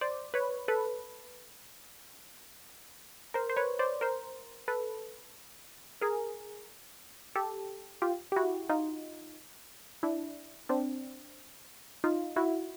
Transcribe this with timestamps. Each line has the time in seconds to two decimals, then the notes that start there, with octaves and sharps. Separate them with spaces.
0.01 C5 D5
0.34 B4 C#5
0.68 A4 B4
3.34 A#4 C5
3.50 C5
3.57 B4 C#5
3.79 C5 D5
4.01 A#4 C5
4.68 A4 B4
6.01 G#4 A#4
7.36 G4 A4
8.02 F4 G4
8.32 G4
8.36 E4 F#4
8.69 D#4 F4
10.03 D4 E4
10.69 C4 D4
12.04 D#4 F4
12.36 E4 F#4